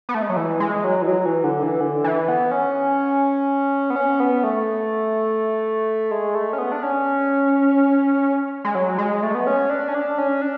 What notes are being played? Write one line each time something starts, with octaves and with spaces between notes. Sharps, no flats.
B3
A3
G#3
F#3
E3
G#3
F#3
E3
F#3
E3
D3
E3
D3
E3
B3
C#4
B3
C#4
B3
A3
G#3
A3
C#4
B3
D4
C#4
G#3
F#3
G#3
A3
B3
C#4
D4
C#4
D4
C#4
D4